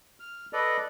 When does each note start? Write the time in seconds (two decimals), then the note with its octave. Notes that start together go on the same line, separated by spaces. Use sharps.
0.20 F6
0.53 A4 B4 D5 D#5